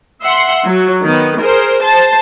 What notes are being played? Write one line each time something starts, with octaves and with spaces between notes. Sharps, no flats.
E5 F#5 C6
F#3
D#3 B3
G#4 A#4 C5
C5 A5